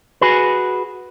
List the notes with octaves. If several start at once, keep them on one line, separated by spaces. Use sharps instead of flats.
F#4 G#4 B4